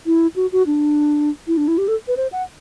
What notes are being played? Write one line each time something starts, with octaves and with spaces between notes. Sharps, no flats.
E4
F#4
F#4
D4
E4
D4
E4
G4
A4
B4
C5
F#5